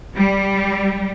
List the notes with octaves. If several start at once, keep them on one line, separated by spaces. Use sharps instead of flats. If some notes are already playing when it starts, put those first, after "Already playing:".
G3